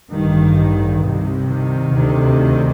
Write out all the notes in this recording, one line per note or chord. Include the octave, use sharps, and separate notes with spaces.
A1 G2 D#3
C2 C3
D#3
D2 C3